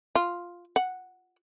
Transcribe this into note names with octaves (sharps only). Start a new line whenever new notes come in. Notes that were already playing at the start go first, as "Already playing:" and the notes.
F4
F#5